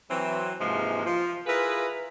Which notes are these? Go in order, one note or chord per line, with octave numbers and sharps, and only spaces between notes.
E3 F#3 C4
G#2 C3 E3 F3 G#3 A#3
F3
E4 F4 G#4 A#4 B4